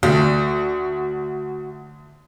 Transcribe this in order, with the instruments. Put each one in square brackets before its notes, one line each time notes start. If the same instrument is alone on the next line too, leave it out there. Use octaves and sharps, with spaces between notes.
[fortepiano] D2 [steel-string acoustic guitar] F#4